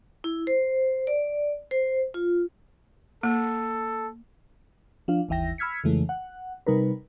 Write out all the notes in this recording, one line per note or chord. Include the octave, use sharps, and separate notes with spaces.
E4
C5
D5
C5
F4
A#3 A4
F3 D4 F4 F5
G1 D#2 E3 E5 G5 A#6
B5 E6 F6 G#6 B6 C#7
F2 C#3 E3 G#3 A3
F#5
C3 G3 D#4 A#4 B4